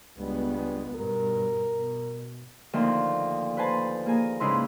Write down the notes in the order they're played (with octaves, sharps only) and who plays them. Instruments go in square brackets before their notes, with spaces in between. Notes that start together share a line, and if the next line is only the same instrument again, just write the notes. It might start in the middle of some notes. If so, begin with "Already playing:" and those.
[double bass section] C#2 G#3 B3 [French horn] G2
[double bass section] G2 B2 [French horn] A#4
[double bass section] B2
[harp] D2 D#3 F3 A#3 G5
B4 C5 G#5 A5
A#3 G#4 A#4 G#5
G#2 C#3 E4 B4 C6